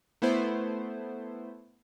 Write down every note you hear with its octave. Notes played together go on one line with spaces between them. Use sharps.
A3 B3 E4 C5